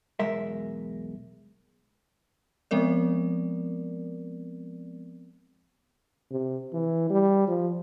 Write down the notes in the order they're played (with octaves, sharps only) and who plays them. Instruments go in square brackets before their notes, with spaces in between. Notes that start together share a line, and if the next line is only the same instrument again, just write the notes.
[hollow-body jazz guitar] B1 E2 G#3 A#4 E5
[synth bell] F3 G#3 B3 C4 A#4 D5
[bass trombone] C3
E3
G3
F3